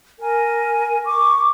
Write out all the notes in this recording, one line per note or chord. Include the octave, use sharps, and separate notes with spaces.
A#4 G#5
C#6 D6